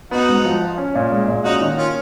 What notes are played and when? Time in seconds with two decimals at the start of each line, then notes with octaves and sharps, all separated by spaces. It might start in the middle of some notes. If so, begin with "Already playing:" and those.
0.11 B3 D#4 F#4
0.28 G#2
0.45 F3
0.61 F4
0.78 C#4
0.95 A#2
1.12 G#3
1.28 A#2
1.44 C#4 D#4 F#4
1.61 D#3
1.77 A#3 C#4 F4